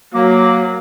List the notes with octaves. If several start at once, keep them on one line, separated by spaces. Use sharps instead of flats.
F#3 A#3